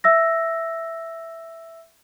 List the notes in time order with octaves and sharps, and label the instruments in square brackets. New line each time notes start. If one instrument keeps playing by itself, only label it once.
[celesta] E5 E6 A#6